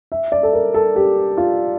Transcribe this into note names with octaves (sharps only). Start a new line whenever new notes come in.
E5
D5
A4
A#4
A4
G4
F4